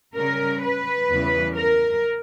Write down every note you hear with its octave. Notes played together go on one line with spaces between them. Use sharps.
C#3 G3 C#4 A#4
B4
E2 C#3 E3 G3
A#4